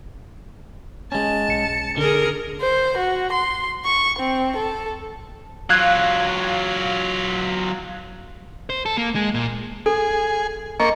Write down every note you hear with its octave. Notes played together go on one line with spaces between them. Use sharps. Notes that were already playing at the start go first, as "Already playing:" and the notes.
G#3 C#4 A5
B1 C#7
D3 G#4 A#4
C5
F#4
C6
C#6
C4
A4
F#3 F4 F5 F#6 G#6
C5
A4
A#3
G#3
A#2
G#4 A4
A#3 D#5 C#6